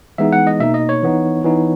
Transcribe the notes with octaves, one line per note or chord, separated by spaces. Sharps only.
E3 G#3 B3 D#4 E5
F#5
D#5
B2 A#3 D#4 E5
D#5
C#5
E3 B3 D#4
E3 B3 D#4